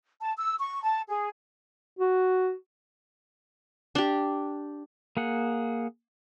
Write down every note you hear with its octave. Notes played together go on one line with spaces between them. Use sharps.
A5
E6
C#6
A5
G#4
F#4
D4 G4
A#3 G#4 F#5